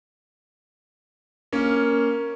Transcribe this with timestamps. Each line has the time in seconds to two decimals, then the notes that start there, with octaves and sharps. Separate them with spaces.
1.52 A#3 C#4